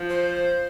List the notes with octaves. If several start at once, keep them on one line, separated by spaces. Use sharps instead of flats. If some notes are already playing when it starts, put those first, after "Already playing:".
Already playing: F3
C5